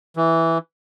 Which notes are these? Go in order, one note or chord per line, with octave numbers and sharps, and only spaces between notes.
E3